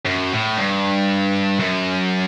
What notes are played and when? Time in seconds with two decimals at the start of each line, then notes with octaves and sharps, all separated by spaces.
0.06 F#2
0.33 A2
0.57 G2
1.59 F#2